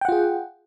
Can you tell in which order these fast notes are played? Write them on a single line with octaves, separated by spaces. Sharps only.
G5 F#5 F4 G#4